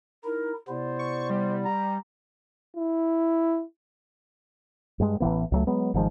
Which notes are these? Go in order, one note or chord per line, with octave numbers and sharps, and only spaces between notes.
D#4 E4 A#4
C3 B3 E4 C5 D5
C#6
G3
A#5
E4
G2 G#3
A1 D#3 E3 B3
C#2 F#3 A3
F#3 G#3 B3
G#1 D#3 F3 G#3